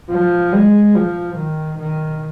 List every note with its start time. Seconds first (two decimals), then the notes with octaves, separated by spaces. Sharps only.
0.11 F3
0.53 G#3
0.95 F3
1.37 D#3
1.79 D#3